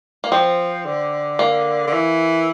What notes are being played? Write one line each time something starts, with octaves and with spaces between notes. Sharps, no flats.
A#3
F3 C4
D3
A#3
D3
E3